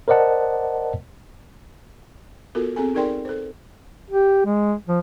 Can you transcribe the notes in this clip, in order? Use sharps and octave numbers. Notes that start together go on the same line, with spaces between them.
A#4 C5 D5 D#5 F#5 A5
B3 F4 F#4 A4 A#4
C4 G#4 A4 G#5
D#4 G#4 A#4 D5 G5 C6
A4 C5
G4
G#3
F3